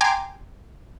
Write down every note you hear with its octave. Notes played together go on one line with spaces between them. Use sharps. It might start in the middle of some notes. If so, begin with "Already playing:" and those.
G5 G#5 A#5 C6 D6